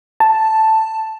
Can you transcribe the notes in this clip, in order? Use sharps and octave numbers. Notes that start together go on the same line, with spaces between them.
A5